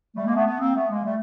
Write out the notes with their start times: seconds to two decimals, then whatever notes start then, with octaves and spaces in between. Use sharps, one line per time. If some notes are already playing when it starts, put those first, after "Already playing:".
0.16 G3 A3
0.26 G#3 A#3
0.35 A3 B3
0.46 A3 B3
0.60 A#3 C4
0.75 A3 B3
0.90 G#3 A#3
1.05 G3 A3